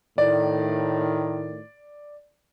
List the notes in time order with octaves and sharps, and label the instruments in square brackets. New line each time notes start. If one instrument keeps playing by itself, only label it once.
[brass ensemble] A2 D#3 [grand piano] D5